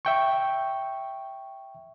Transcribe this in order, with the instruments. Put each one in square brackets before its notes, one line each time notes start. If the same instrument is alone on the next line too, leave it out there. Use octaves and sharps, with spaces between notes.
[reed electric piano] E5 G5 C#6